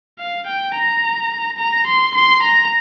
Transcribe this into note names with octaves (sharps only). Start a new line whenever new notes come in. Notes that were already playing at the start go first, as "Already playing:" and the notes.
F5
G5
A#5
A#5
C6
C6
A#5